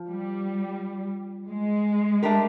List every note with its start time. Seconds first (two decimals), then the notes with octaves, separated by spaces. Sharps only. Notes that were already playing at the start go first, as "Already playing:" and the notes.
Already playing: F3
0.09 G3
1.51 G#3
2.23 A3 D4 G4 A#4